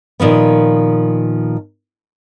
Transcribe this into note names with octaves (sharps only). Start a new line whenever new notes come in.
A#2 D#3 F3 B3